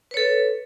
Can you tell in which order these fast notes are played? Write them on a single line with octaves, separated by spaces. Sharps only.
B4 C#5 A4